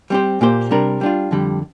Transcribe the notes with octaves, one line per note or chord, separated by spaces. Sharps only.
G3 C4 G4 C5
A#2 A#3 G4 C5
C3 G3 D4 A#4
G3 D4 F4
F2 D3 G3